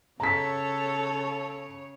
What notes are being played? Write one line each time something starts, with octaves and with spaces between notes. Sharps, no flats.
C#3 A4 C#5 A#5 B6